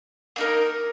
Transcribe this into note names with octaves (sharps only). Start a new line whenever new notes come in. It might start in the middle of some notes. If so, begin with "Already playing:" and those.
A#3 D#4 A#4